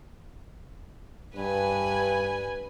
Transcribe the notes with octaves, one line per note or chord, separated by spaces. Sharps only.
G2 B4 G#5